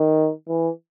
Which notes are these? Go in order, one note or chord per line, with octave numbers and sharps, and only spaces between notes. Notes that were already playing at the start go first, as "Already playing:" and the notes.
Already playing: D#3
E3